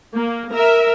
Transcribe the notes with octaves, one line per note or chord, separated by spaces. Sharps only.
A#3
A#4 E5